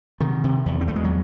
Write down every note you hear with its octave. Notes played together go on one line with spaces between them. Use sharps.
C3 D#3
C3
E2
C4
E2 A3
G#3
F#3